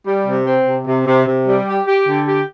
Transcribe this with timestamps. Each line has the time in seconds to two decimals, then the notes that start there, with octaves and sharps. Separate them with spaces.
0.07 G3
0.26 C3
0.47 C4
0.66 C3
0.87 C3
1.07 C3
1.27 C3
1.47 G3
1.68 G4
1.87 G4
2.07 D3
2.28 G4